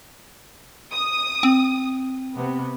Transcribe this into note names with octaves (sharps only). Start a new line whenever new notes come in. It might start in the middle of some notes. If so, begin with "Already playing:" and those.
D#6
C4
C3 B3